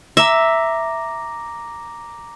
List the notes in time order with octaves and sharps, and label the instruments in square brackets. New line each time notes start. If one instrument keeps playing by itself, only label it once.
[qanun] E5 [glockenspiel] A#5 D6 A#6